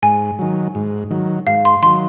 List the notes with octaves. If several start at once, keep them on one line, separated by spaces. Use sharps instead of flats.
G#2 G#5
D#3 F#3
G#2
D#3 F#3
G#2 F5
C6
D#3 F#3 C6